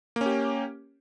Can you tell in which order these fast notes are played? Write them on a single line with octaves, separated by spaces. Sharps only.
A#3 C#4 G4